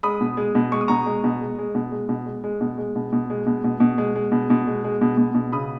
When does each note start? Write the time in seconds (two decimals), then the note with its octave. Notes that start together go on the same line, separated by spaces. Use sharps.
0.03 G#3 B5 D#6
0.21 B2
0.37 G#3
0.55 B2
0.72 G#3 C#6
0.81 D#6
0.88 B2 A#5 C#6
1.06 G#3
1.24 B2
1.41 G#3
1.58 G#3
1.75 B2
1.92 G#3
2.09 B2
2.26 G#3
2.44 G#3
2.61 B2
2.78 G#3
2.96 B2
3.13 B2
3.30 G#3
3.46 B2
3.64 B2
3.80 B2
3.98 G#3
4.16 G#3
4.32 B2
4.50 B2
4.67 G#3
4.84 G#3
5.01 B2
5.17 B2
5.35 B2
5.52 C#3 B5 D#6